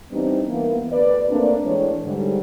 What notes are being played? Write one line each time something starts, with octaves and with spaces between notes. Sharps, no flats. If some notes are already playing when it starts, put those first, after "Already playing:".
E3 G3 B3 C4 D4 D#4
E3 A#3 B3
D2 B4 D5
A3 A#3 C4 D4
A2 E3 G#3 D4 C#5
G#2 D3 G3